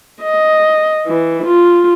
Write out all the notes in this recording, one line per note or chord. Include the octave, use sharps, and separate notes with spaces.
D#5
E3
F4